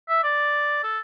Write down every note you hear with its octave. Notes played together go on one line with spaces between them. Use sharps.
E5
D5
A4